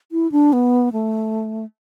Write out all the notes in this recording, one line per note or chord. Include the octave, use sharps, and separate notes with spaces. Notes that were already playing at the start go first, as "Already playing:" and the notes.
E4
D4
B3
A3